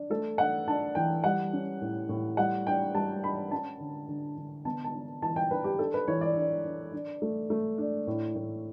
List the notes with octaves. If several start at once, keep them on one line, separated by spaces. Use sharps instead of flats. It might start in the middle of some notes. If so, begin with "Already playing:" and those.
Already playing: D4
A3 A4
D4 F#5
D4 A5
E3 G5
G3 F#5
C#4
A2
A2
G3 F#5
D4 G5
G3 A5
D4 B5
C#4 A5
D3
D3
D3
B3 A5
A5
D4
E3 A5
G5
D4 B4
G4
D4 A4
B4
E3 C#5
D5
D4
D4
D4
A3
A3
D4
A2
A2